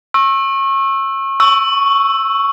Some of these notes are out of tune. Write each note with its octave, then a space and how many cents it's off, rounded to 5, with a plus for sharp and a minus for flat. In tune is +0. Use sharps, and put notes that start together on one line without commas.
C#6 -30 E6 +0
C#6 +0 E6 +0